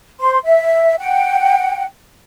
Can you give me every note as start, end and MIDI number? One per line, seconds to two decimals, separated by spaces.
0.20 0.38 72
0.20 0.38 84
0.43 0.95 76
0.98 1.84 78
0.98 1.84 79